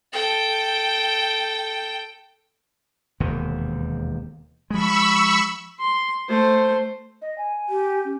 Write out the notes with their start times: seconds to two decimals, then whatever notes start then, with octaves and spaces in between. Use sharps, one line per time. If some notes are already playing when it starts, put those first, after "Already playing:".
0.13 A4 G5
3.20 E1 D#2 C3
4.70 F3 G#3 B5 C#6 E6
5.80 C6
6.29 A3 C5
7.22 D#5
7.38 G#5
7.69 G4
8.05 C#4